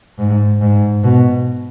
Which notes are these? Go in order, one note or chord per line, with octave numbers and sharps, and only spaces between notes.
G#2
G#2
B2